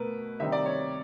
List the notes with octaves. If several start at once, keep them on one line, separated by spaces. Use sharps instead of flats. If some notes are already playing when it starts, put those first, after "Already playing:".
Already playing: B2 A3 A#4 B4
C3 D#3 G3 C4 D#4 E5
D5
C#5